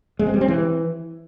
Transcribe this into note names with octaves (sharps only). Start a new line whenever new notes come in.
G#3
C4
G3
C4
E3